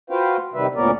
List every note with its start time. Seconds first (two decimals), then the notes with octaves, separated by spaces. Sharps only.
0.10 F4 F#4 B4 C5 F5 G5
0.54 C3 D#3 G3 B4 E5
0.75 D2 A#2 B3 C#4 A#4 D5